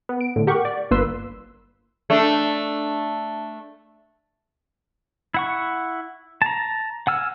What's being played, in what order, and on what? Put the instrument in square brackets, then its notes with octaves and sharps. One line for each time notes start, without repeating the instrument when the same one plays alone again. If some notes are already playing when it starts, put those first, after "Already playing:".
[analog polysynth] B3
D7
A2 D3
G4 A#4 F#5 C#6
D5
G1 A#3 B4 C6 E6
[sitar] A3 D4
[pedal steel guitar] E4 F#5 C#6
A5 A#5
F#5 G#5 E6 F6